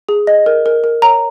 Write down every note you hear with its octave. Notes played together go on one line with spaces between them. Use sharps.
G#4
D#5
A#4
A#4
A#4
C#5 A#5